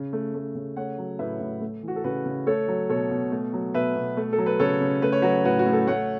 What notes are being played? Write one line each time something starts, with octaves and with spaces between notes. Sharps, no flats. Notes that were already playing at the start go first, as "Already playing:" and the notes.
Already playing: C#3
A3
A3
C#3
A3 C#5 F#5
F#3
A2 B4 E5
A2
A3
E3 F#4
A4
C#3 F#4 B4
C#3
A3 A4 C#5
F#3
B2 A4 C#5
B2
A3
F#3
B2 B4 E5
B2
A3
A4
F#3
B4
C#3 A4 C#5
C#3
A3 B4
C#5
F#3 F#4 B4
A2 F#4 B4
F#4
A2
A4
A3 C#5 F#5